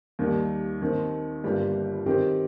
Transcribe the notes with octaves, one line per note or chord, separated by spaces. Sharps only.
D#2 D#3 G3 A#3
D#2 D#3 C4
G1 G2 G3 A#3
D#3 C4 G4 C5